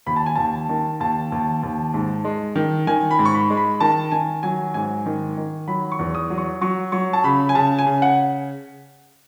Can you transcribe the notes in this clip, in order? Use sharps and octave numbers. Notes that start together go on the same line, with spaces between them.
D#2 B5
A5
G#5
D#2 A5
D#3
D#2 A5
D#2
D#2
G#2
G#3
D#3
D#3 G#5
B5
G#2
C#6
B5
G#3
B5
D#3 A5
D#3 G#5
F#3 G#5
G#2 G#5
D#3
D#3
F#3 B5
C#6
E2
D#6
F#3
C#6
F#3 C#6
F#3 C#6
A5
C#3 B5
G#5
C#3 A5
G#5
C#3
F#5